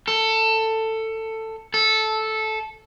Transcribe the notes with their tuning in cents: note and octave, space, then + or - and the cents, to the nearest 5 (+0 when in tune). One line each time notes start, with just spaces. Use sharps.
A4 +15
A4 -10